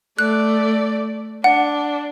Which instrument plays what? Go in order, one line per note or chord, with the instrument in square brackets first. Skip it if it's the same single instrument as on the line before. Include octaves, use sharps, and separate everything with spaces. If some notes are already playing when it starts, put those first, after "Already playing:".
[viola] A3 D5 [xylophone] F#6
[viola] D4 [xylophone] F#5